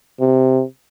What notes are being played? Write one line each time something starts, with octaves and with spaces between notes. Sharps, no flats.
C3